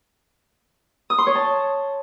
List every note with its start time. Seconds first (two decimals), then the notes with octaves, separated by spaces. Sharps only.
1.10 D#6
1.18 C6
1.27 C#5
1.35 A5